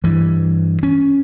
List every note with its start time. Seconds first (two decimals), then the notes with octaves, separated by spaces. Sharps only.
0.04 G2 E3
0.83 C#4